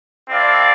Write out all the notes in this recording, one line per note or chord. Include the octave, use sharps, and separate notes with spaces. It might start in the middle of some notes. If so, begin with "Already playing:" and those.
C4 E4 A4 D5 F5